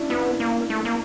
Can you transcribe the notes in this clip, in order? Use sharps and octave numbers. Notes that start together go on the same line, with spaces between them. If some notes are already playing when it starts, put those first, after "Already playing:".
Already playing: C#4 D4 E4
B3 E4
A#3
A3
A#3